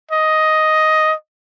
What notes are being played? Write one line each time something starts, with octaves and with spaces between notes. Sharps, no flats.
D#5